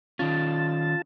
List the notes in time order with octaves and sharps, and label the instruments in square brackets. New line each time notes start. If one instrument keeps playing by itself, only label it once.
[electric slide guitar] D#3 C#4 [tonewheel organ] F4 A5